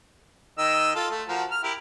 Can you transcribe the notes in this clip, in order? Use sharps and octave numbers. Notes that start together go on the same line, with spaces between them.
D#3 D#5 E6
F4 A4
A3
F3 F#4 A#4
F6
E4 G4 A#4